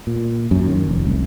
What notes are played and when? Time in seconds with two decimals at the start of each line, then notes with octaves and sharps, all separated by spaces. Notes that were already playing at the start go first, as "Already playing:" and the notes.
0.07 A#2
0.51 F#2
0.67 D#3
0.89 F1
1.05 C2